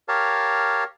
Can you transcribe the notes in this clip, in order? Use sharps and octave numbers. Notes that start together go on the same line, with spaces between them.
G4 A#4 C#5 F5 A5